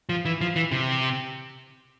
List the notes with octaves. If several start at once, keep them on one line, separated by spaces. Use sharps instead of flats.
F3
E3
F3
E3
C3